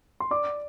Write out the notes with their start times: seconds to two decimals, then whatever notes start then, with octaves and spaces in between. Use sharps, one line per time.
0.20 C6
0.31 D5 D6